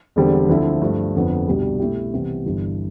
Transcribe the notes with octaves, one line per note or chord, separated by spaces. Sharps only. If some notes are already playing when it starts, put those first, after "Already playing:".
E1 E2 D3 G3 C4
D2 D3 F3 C4 E4
G2 F3 A3
F1 F2 D3 F3 B3
C2 B2 G3 D4
B2 A3 E4 G4
C2 C3 E3 B3
G1 G2 E3 G3